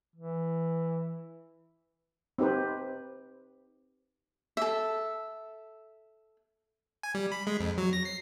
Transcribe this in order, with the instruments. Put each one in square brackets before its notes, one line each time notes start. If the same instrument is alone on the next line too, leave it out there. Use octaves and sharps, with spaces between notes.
[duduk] E3
[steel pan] C4 D#4 G4 B4 C5
[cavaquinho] A4 E5
[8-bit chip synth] G#5
G3
B5
G#3
F2
F#3
A#6
C7